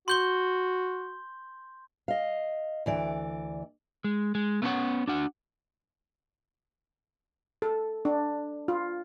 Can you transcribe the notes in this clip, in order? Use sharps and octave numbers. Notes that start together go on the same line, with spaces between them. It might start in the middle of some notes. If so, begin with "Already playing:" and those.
F#4 C6 G6 G7
D#5 F5
D2 E3 D5
G#3
G#3
A3 B3 C#4 D4 C#5 F#5
D4 F#4 F#5
A4
D4
F4